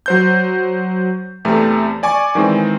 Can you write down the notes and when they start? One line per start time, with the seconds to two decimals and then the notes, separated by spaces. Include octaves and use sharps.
0.06 F#3 C5 G6
1.45 E2 C3 A3
2.03 D5 G#5 C#6 D6
2.35 D#3 E3 G#3 C4